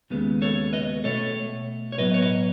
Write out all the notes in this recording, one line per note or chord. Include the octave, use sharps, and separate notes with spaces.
D#2 C#3 G#3 B3
A4 C#5
B4 D#5
B2 A3 A4 C#5
C#5
A2 F#3 B3 B4 D#5
C#5
B4 D#5